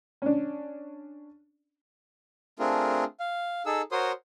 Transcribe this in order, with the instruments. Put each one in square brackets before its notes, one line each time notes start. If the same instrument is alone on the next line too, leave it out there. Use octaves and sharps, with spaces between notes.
[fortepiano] C#4 D4
[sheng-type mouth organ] A3 C4 D4 F4 G#4 A#4
F5
D#4 G#4 A4 E6
F#4 A#4 C5 C#5 C6 D#6